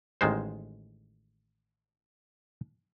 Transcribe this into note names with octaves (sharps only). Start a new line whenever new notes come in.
A1 D#3 G#3 C5